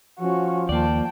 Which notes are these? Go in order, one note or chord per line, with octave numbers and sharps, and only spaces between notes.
F3 C#4 F#4
D#2 A#3 D5 G5 A5